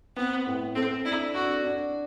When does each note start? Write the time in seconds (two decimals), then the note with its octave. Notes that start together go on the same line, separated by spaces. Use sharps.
0.16 B3 C4
0.46 A2
0.75 C4 A4
1.05 D4 E4
1.34 D4 F#4
1.64 D4